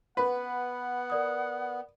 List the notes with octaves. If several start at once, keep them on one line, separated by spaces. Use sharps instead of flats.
B3 B4 F#5
A#4 D5 D#6